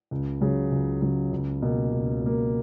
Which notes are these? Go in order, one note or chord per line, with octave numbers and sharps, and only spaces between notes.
C#2
C#3 F#3
C#2
C#3 F#3
C#2
B2 A#3
C#2
B2 A#3